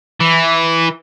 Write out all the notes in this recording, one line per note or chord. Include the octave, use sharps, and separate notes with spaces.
E3